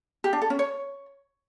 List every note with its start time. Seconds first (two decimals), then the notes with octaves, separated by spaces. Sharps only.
0.24 G4
0.33 D4
0.42 A4
0.50 C#4
0.59 C#5